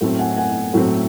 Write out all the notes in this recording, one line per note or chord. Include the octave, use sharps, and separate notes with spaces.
A2 F#3 A3 C4
F#5 G#5
F#5 G#5
A2 F#3 A3 C4